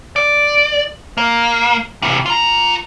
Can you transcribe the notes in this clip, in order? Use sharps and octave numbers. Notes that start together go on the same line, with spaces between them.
D5
A#3
C3 E3
F4 A#5